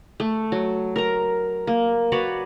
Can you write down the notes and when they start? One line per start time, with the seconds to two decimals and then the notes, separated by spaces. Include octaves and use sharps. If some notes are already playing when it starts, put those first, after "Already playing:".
0.20 A3
0.52 F#3
0.96 A#4 A#5
1.67 A#3
2.12 F#4 B4 C#5 D5